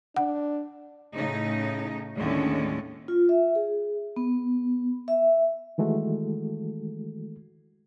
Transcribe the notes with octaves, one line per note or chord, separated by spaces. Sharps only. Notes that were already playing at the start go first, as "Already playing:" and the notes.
D4 F#5
A2 C#3 D#4
D#2 A2 D3 G#3 C#4
F4
E5
G#4
B3
E5
D#3 E3 G#3 A3 F#4 A4